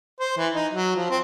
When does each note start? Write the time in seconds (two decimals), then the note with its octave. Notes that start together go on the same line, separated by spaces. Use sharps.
0.20 C5
0.38 E3
0.55 D#4
0.73 F#3
0.96 F3
1.10 C4